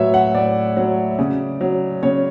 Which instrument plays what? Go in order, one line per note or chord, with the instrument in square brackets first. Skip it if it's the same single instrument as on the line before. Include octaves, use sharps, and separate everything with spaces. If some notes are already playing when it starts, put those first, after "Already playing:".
Already playing: [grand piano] A2 F#3 B4 C#5 E5
F#5
A2 D5
F#3
C#3
F#3
C#3 C#5